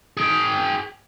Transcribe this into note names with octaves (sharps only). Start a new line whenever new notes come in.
G#4 G5